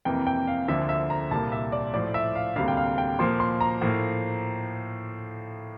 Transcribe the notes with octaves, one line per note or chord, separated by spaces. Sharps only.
F2 C3 E3 A#3 G5
G5
F5
D2 D3 F3 A#3 E5
E5
A#5
C2 A#2 G3 A#3 A5
E5
D5
A2 F3 A3 D5
E5
F5
D2 C3 G3 A#3 F5
G5
F5
G5
A#2 F3 A#3 C6
C6
A#5
A2 F3 A#3